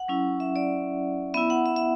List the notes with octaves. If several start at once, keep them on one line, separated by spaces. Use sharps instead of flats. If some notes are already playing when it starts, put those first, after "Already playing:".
Already playing: F#5
F#3 C#4 E4
E5
D5
B3 E4 E5
F#5
E5
E5